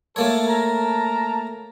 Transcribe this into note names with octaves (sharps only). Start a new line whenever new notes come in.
A3 A#3 A4 C#5
A#4 A5 A#5